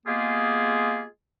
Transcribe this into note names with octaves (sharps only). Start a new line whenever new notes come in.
G#3 A#3 B3 F4 G4 G#4